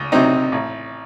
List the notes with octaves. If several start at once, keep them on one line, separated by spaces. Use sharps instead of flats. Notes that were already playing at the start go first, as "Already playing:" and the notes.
Already playing: C#2
C3 F#3 C4 D#4
A1